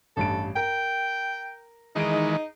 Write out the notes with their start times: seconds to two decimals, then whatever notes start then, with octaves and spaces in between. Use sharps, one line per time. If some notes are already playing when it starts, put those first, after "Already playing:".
0.17 A1 G2 A4 D7
0.56 A#4 G5
1.96 D#3 E3 G#3 D#4 G#4 D7